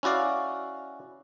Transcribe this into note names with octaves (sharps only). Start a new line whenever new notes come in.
C#4 E4 F#4 D5 F5